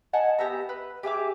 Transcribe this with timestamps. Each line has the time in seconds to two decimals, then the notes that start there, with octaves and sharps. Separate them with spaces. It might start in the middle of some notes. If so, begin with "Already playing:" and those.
0.13 D#5 F#5 G#5 A5
0.39 B3 G4 E5 A#5
0.69 B4
1.03 G4 G#4 E5 D6